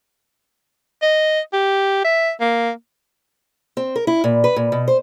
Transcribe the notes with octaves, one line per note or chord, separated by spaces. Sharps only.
D#5
G4
E5
A#3
C4
A#4
E4
A#2
B4
A#2
B2
C5